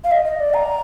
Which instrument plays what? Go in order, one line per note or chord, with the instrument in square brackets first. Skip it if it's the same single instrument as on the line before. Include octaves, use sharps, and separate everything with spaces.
[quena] F5
D#5
D#5
D5
A#5